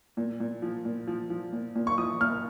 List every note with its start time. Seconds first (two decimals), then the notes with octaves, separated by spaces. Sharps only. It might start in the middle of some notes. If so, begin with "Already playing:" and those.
0.17 A#2
0.40 A#2
0.62 F3
0.85 A#2
1.08 F3
1.30 F3
1.53 A#2
1.75 A#2
1.87 C#6
1.98 F3 D#6
2.21 A#2 F6